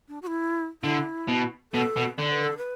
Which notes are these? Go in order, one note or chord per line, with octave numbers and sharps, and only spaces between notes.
D4
F#4
E4
D3 E4
B2
B2 A4
B2
D3 D5
B4
A4
B4